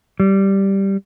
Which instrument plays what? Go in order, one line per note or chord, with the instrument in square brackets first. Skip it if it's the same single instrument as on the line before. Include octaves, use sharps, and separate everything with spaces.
[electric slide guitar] G3